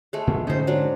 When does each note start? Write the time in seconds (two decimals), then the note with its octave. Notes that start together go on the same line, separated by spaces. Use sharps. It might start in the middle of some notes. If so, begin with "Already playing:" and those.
0.13 G#3 A3
0.27 A#2
0.47 G#2 D3 C#4 D#4 C5
0.67 F#3 D4